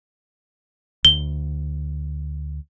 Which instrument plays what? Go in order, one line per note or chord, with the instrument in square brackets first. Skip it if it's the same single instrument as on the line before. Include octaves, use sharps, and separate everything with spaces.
[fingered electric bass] D2 [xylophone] G7